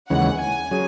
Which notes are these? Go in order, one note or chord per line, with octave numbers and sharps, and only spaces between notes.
D#2 C#3 E3 G#3 C#4 F#5
G#5
F#3 C#4 G#4